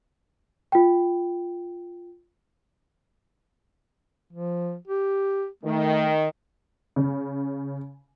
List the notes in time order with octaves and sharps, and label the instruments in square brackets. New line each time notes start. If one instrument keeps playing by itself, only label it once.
[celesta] F4 G5
[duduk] F3
G4
[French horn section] D#3 [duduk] A3
[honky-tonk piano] C#3